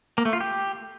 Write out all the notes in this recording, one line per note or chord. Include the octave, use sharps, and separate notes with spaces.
A#3
A3
F4
G4